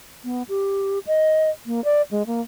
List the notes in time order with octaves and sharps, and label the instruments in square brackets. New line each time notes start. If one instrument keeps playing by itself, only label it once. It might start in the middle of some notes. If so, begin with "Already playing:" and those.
[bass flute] B3
G4
D#5
A#3
D5
G#3
A#3